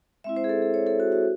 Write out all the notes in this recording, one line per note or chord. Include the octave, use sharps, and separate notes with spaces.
G#3 C4 E4 E5
C5
G#4
A4
G#4
C#5
A4
F#4
F#4